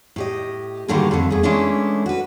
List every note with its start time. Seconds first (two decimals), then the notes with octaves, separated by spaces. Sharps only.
0.16 A2 G4 D#5
0.88 G#2 D3 D#3 F#3 G3 A#3
1.11 F2 A2 D3 A3
1.30 E2 G#4
1.43 E3 G#3 A3 C#4 D4 E4
2.06 F#4 B4